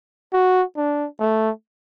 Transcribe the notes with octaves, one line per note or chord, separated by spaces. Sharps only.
F#4
D4
A3